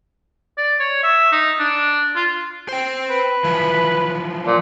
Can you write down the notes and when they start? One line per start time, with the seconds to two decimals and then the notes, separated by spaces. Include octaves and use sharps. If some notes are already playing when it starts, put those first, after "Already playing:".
0.58 D5
0.80 C#5
1.04 E5
1.32 D#4
1.59 D4
2.16 F4
2.69 C5 G5
3.10 B4
3.44 E3 F3
4.46 A#2